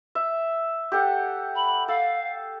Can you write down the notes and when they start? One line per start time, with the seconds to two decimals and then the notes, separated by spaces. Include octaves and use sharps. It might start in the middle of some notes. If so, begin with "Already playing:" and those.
0.15 E5
0.92 G4 A4 F#5
1.55 B5
1.88 A4 F5